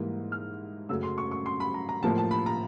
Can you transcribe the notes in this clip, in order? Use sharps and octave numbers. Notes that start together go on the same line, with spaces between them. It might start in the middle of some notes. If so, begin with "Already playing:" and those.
Already playing: G#2 E3 G3 A#3
F6
F#2 C#3 F#3 A3 E6
C6
C#6
C#6
C6
B5
A#5
A#5
A2 F3 A#3 A5
A5
B5
A#5